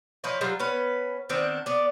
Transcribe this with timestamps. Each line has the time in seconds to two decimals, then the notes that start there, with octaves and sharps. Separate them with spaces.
0.24 F3 B4 C#5 D#5
0.41 F#3 G3 F4
0.59 B3 C#4 B4
1.29 D#3 B3 C4 D4
1.66 B3 D5